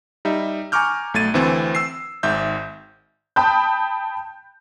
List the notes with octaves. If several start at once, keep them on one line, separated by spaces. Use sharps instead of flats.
G3 D#4 E5
G#5 A#5 C#6 D6 F6 G6
B1 A3 G#6 A6 D#7
D2 E3 C4
E6 C7
G#1 G#2 E5 G6
G5 A5 B5 D#6 G6